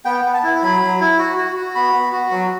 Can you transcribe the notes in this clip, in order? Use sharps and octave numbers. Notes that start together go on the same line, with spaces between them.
B3 G5
B3
A5
E4
F#3 B5
F#3
E4
F#4
F#4
F#4
B3 B5
B3
F#4
F#3